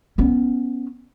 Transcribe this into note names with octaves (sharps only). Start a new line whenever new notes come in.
B3 C#4